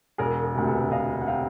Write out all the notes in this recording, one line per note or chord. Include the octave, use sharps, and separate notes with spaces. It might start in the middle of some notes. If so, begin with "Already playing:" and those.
E1 G#4 A#4
G#4 A#4
D2 C3
A4 B4
E1 D#5 F5
F#5
C3 F5 G5